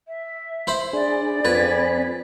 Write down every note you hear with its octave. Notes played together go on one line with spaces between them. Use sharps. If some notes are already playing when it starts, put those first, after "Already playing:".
E5
E4 C5 B5
D4 G#4 D5
F2 C4 B4 G#5 B5